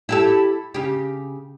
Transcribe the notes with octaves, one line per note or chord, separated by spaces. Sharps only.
E4 G4 A4
C#3 G4